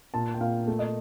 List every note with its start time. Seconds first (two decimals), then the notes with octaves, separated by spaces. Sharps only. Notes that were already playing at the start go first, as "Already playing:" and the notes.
0.14 A#2 A5
0.34 G5
0.41 A#2 F5
0.67 A3
0.79 D#5